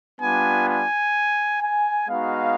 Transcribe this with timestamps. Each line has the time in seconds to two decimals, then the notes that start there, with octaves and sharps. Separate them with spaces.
0.20 G3 B3 D4 F4 G#5
0.67 G#5
1.61 G#5
2.08 G#3 B3 D#4 F#4 F5